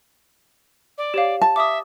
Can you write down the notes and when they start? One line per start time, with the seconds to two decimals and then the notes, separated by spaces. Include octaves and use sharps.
0.97 D5
1.14 G4 C#5 F5
1.41 A5
1.56 E5 D6 D#6